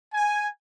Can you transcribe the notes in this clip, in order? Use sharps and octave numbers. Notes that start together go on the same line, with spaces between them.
G#5